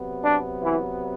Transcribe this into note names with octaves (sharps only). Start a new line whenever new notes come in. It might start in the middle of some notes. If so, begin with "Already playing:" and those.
Already playing: C3 F#3 B3
D4
E3 E4